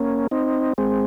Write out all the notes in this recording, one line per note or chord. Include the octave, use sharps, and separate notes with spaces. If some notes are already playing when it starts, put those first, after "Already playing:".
Already playing: A#3 C#4
C4 D#4
G#3 C4